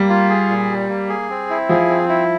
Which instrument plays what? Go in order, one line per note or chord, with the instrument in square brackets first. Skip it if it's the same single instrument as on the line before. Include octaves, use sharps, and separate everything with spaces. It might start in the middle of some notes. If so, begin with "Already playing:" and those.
Already playing: [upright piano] G3 [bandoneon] A#3
[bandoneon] F4
G#4
A#2
G3
A#3
G#4
C4
E4
[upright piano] F3 [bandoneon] G#4
[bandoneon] C4
E4